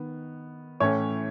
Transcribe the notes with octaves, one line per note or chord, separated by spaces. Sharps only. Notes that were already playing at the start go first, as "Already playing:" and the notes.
Already playing: D#3 B3
A2 E3 A3 C#4 C#5